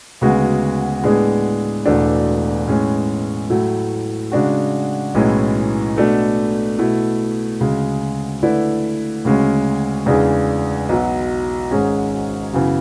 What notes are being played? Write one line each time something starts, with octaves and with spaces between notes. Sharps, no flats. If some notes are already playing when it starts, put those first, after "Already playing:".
D2 C#3 G#3 B3 F#4
A2 G#3 B3 D4 G#4
E1 E2 B2 A3 D4
A2 G#3 C#4
A2 F#3 A3 E4
C#3 G#3 D4 F#4
B1 A2 E3 G#3 C#4
B2 A3 D4 A4
B2 A3 E4
D2 C#3 G#3
D3 A3 E4 B4 D5
D2 C#3 G#3 C#4
E2 C#3 G#3 D4 G#4
B1 B2 F#3
G#1 G#2 G#3 C#4 G#4
F#2 C#3 E3 B3